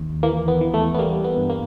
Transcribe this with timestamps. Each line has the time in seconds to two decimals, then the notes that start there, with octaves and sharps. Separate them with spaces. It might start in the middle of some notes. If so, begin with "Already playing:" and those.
Already playing: D#2
0.23 E3 A#3
0.48 B3
0.61 E3
0.74 A3
0.94 B3
0.99 G3 A#3
1.24 B3
1.37 G2
1.50 A#3